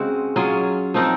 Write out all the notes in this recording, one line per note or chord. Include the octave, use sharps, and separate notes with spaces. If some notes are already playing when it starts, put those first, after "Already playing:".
Already playing: C#3 G#3 C4 F#4
F#3 C#4 F4 G#4
F3 C4 D#4 A#4